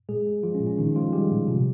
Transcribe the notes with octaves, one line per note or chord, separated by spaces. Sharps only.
A#2 G#3 G#4
G#3
F3 G#3 F4
C#4
A#2
C#4
A#2 D#3 D#4
F3 G#3 F4
G3 G#3 G4
A#2
C3